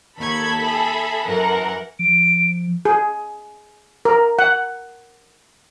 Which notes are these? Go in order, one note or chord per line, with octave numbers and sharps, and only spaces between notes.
D#2 A4 B5 C#6 G#6
G#4 E5
F#2 E3 A#4 F#5
F3 D7
G#4
A#4
F#5